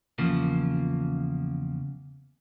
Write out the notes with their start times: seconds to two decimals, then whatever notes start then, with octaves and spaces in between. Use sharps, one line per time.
0.18 E2 C#3 F3 A#3